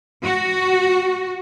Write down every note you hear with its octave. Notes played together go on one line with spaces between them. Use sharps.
F#4